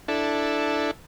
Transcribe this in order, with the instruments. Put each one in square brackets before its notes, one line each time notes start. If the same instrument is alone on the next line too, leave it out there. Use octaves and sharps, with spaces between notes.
[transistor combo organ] D4 E4 A4